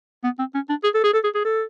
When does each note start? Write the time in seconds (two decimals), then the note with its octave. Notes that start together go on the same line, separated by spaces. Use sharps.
0.24 B3
0.39 C4
0.54 C#4
0.69 D4
0.84 G#4
0.94 A4
1.04 G#4
1.13 A4
1.24 G#4
1.35 G#4
1.45 A4